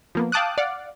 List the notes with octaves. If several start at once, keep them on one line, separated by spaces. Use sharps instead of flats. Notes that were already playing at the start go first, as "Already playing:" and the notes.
F3 A#3 B3
F5 G5 A5 D6 D#6 F#6
D5 F5 F#5